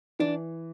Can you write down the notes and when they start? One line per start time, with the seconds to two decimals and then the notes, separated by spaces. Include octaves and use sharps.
0.20 E3 D4